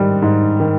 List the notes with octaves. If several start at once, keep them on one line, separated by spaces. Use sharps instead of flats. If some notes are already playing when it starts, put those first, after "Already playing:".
Already playing: G#2 D#3 G3
G#2
D#3